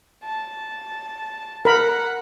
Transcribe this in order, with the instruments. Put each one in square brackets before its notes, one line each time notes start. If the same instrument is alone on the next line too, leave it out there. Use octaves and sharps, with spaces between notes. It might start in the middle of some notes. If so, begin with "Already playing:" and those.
[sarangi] A5
[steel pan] A#4 B5 [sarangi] F#5